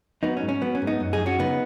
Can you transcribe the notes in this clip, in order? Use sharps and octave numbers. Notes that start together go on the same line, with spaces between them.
F#3 B3 D#4
C#4
G#2
C#4
F#3 B3
C#4
G#2
B3 D#4
F#2
D#4 G#4
F#2
C#4 F#4
C#3 B3 D#4